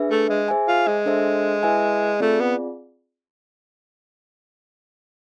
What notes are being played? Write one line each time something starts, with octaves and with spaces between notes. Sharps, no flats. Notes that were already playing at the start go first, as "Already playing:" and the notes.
Already playing: D4 G#4 B4 E5
A3
G#3
G#4 C5 E5 G#5
F4
G#3
D4 A4 C5 E5
E4 B4 E5 G#5
A3 C4 F4 G#4 D5
B3